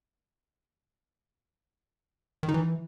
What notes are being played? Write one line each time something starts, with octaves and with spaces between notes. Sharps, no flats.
D#3
D#4
E3